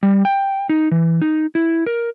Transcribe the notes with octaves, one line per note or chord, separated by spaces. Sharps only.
G3
G5
D#4
E3
D#4
E4
A#4